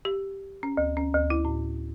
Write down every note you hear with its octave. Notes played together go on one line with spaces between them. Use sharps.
G4
C#4
D2
C#4
D2
E4
A2